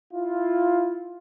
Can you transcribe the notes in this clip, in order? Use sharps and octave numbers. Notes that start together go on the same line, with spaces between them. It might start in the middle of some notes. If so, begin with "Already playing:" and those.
E4 F4